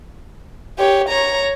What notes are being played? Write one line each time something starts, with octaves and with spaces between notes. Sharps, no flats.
G4 C#5
C#5 A#5